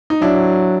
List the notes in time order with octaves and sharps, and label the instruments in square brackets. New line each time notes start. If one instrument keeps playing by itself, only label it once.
[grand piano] D#4
[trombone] F#3 [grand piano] D4 E4